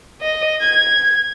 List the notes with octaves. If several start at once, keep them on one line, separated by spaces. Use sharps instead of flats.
D#5
G#6